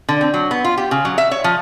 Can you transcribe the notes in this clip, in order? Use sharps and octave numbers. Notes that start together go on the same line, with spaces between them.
D3
C4
F#3
B3
F4
G4
C#3
F#3
E5
C#5
F3